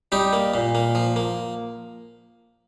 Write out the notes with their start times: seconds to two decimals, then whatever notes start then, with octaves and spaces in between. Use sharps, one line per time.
0.12 G3 D#4 G4
0.33 A#3
0.54 A#2
0.75 A#3
0.95 F3
1.16 A#3